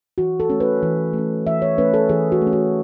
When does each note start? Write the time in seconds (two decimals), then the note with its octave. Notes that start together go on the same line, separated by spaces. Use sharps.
0.18 E3 F#4
0.40 A4
0.50 A3 C#4
0.60 B4
0.83 E3
1.13 A3 C#4
1.47 E3 E5
1.62 C#5
1.78 A3 C#4 B4
1.94 A4
2.09 E3 G#4
2.32 F#4
2.42 A3
2.47 C#4
2.53 F#4